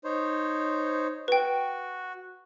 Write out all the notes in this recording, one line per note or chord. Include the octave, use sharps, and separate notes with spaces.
D#4 C5 C#5
F#4 B4 G5